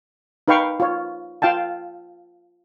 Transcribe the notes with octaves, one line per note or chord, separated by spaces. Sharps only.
D#4 B4 F5 G5 C#6
F4 C#5
F4 F5 G5 A5